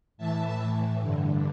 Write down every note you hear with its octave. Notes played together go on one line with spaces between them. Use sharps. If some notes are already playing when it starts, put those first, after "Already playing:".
A2 E3 E5 A5
A2 E3
G2 D3